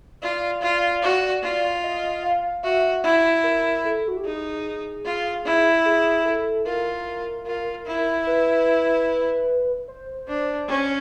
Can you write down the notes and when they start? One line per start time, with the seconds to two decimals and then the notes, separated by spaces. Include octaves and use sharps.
0.22 F4 D5
0.62 F4
1.03 F#4
1.43 F4
1.84 D#5
2.23 F5
2.63 F#4 E5
3.04 E4
3.44 A#4
3.85 A4
4.08 F#4
4.17 G4
4.25 D#4 G#4
5.05 F4
5.45 E4
5.85 G#4
6.25 A4
6.65 F4 A#4
7.47 F4
7.86 E4
8.27 B4
9.88 C5
10.28 D4
10.68 C#4